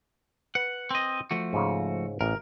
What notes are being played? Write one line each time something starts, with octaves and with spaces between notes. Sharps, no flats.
B4 F#5
C4 D#5
F3 A3 F#4
G#2 C#3
A1 A#4